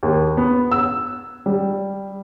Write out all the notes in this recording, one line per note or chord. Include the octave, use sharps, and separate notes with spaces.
D#2
B3
E6
G3